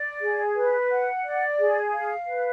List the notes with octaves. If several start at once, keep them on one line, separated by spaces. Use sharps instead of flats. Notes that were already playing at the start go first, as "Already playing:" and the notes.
Already playing: D5
G#4
B4
F#5
D5
G#4
F5
B4